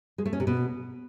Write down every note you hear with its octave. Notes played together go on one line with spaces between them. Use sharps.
G#3
A3
C#4
C3
B2